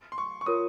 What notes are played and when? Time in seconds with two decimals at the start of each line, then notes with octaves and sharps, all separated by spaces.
0.12 C6
0.18 C#6
0.41 C#6
0.46 F4 A#4 C#5 D#6